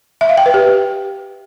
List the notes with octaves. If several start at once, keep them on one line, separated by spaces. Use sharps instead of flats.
E5
F5
G5
B4
G4